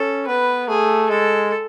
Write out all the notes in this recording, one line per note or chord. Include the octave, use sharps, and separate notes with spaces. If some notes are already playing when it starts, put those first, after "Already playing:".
Already playing: C#4 A4
B3 B4
A3 G#4
G#3 A4